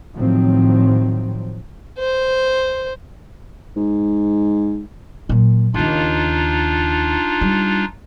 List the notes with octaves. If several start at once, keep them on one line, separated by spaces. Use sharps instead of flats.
A2 D#3 F3 F#3 C4
C5
G#2
A#2 F#3
D#2 C#3 D4 D#4 F4
G3